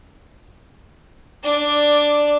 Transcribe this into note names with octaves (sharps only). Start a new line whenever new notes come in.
D4 D5